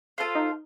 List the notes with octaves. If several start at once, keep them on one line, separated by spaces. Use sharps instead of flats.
F4 A4 C5 F5
D#4